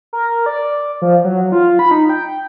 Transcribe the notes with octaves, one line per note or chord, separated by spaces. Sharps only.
A#4
D5
F3
F#3
F4
B5
D#4
G5